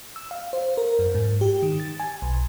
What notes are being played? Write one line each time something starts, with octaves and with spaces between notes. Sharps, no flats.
E6
F5
C5
A#4
F#2
G#2
G4
D#3
A6
G#5
B1